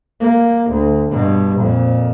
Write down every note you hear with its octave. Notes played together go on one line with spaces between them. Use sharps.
A#3
D2
G2 B2
F2 A#2